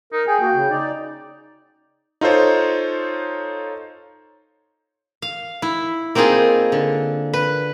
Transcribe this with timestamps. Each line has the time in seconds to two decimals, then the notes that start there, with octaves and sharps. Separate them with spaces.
0.13 D#4 A#4
0.28 G#4 G5 G#5
0.41 A#3 F#4
0.53 C#3
0.70 D#4 D5
2.21 D#4 F4 A4 C5 C#5
5.22 F5
5.62 E4
6.15 A#3 C4 D#4 F4 G#4
6.72 D3
7.33 B4